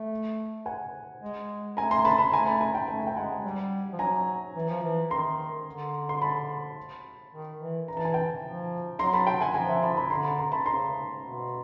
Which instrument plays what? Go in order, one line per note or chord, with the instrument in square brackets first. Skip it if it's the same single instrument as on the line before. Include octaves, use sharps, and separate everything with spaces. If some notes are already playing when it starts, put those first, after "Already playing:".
Already playing: [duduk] A3
[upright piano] F#5 G#5
[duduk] G#3
[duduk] A3 [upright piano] G#5 A#5
[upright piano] A#5 C6
A5 B5
A5 B5
[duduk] A3 [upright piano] G#5 A#5
[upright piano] A5 B5
G#5 A#5
G5 A5
[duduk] A3 [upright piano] A5
[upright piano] G#5
G5
[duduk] G#3 [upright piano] F#5 G#5
[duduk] G3
F3
[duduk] F#3 [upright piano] G#5 A#5
[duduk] E3
F3
E3
[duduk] D#3 [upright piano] A#5 C6
[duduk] D3
[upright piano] C6
A5 B5
[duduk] D#3
E3
[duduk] E3 [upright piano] A#5
[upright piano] A5
G#5
G5 A5
[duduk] F3
[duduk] F#3 [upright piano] A#5 C6
[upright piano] A5 B5
G5 A5
F#5 G#5
[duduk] F3 [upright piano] G#5 A#5
[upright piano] E5 F#5
A5 B5
A#5
A5 B5
[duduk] D3 [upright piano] A#5 C6
[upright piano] A5 B5
A#5 C6
A5 B5
[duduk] C#3 [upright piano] A#5 C6
[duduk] B2